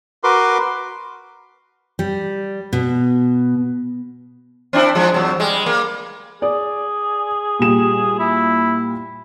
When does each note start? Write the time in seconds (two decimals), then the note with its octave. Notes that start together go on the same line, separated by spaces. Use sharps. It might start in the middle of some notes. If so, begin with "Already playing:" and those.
0.24 F#4 A#4 B4 C6 D6
1.99 G3
2.73 B2
4.73 C4 D4 E4
4.95 F3 G#3
5.14 E2 F#3
5.40 G3 G#3
5.66 A#3
6.42 G#4 D5
7.59 A#2 G3 E7
8.20 E4